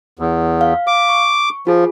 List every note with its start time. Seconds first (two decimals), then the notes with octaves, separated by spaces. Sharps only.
0.19 E2
0.61 F5
0.87 F5 D6
1.09 C#6
1.67 F3 F4 G#4